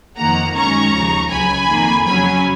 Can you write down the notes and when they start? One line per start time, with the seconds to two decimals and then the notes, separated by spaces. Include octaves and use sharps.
0.17 F2 D#3 A#3 F#5 A#5
0.55 F#2 D#3 G#3 C#4 A#5 C#6
0.93 D#2 C#3 F3
1.30 C#2 C#3 F#3 G#5 B5
1.68 F2 D#3 A#3
2.05 F2 C#3 F#3 C#4 G#5 B5